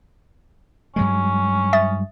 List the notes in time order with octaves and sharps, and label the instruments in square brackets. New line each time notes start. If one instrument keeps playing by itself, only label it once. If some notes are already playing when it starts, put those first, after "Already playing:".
[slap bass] G2 F#3 G#3 [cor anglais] C#4
[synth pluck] E5 D#6 A6